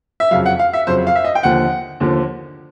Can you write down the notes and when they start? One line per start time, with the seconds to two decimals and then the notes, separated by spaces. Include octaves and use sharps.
0.20 E5
0.31 F2 C#3 F#3 F5
0.46 F#5
0.59 F5
0.73 E5
0.87 F2 C#3 F#3 C5
1.07 F5
1.16 E5
1.25 D#5
1.35 G5
1.43 D#2 D3 F3 F#5
2.00 D#2 D3 F3